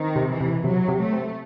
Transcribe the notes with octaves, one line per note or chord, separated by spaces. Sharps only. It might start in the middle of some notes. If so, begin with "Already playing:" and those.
Already playing: D#3 C4
C3
E3
C3
C3 F#3
C3
A3
C4